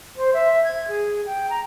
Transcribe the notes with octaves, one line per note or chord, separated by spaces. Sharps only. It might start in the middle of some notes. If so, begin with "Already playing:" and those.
C5
E5
G#6
G#4
G5
A#5